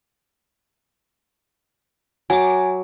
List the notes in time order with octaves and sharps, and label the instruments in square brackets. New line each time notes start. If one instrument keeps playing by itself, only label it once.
[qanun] F#3 D6 [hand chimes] G#5